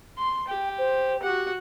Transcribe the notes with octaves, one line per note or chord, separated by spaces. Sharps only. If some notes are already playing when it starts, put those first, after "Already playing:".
C6
G4 G5
C5
F#4 G4 F#5